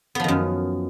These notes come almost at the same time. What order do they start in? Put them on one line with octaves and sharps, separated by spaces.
B3 F3 D#3 F#2